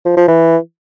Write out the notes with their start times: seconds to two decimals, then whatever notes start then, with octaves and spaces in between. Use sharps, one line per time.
0.05 F3
0.17 F3
0.28 E3